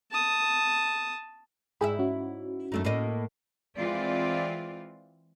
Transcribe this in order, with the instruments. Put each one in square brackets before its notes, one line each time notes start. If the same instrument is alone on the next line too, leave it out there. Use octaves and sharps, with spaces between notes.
[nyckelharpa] A5 D#6
[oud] G#2 E4 E5 [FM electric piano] G#4 G5 B5
[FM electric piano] C#4 F#4
[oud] F#2 A3 D#4
A2 A#3 D#5
[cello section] E3 G#3 C4 F4 D5